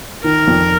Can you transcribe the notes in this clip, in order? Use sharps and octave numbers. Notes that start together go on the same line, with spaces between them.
D#3 A#4
F2